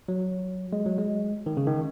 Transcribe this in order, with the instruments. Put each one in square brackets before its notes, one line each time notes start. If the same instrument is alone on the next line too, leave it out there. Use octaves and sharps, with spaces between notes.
[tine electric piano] F#3
G#3
F#3
G#3
D#3
C#3
D#3